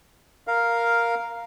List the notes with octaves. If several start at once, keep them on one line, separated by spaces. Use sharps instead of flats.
A#4 F5